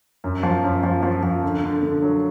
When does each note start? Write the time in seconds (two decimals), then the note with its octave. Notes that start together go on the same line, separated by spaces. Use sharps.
0.24 F#2
0.43 F3
0.64 F#2
0.83 F3
1.03 F3
1.23 F3
1.44 D3
1.64 D3
1.83 D3
2.02 F#3